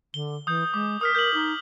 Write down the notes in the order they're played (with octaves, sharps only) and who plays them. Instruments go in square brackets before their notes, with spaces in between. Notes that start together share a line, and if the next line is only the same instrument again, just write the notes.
[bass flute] D3 [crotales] G7
[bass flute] E3 [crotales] D#6 G6
[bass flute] G#3 [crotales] D6
[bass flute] A#4 [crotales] D#6 F6 B6
[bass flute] A#4 [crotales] G6 F#7
[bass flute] D#4